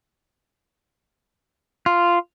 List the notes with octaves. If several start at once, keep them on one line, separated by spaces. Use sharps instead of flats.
F4